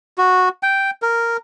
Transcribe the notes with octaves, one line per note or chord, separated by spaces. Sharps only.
F#4
G5
A#4